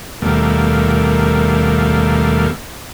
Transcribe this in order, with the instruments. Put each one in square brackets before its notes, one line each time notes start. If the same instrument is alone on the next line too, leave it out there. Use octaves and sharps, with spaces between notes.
[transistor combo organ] D#2 B2 G3 A3 A#3